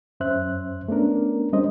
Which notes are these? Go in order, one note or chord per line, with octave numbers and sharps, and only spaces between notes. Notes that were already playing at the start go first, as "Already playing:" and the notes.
F#2 C#4 C5 E5 F#6
A3 B3 C#4 D4 A#4
G3 G#3 C#4 D4 C5 D#5